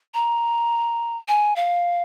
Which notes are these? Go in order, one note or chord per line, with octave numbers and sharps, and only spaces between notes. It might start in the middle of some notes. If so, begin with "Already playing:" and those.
A#5
G#5
F5